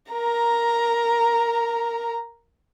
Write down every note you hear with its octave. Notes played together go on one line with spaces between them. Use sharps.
A#4 A#5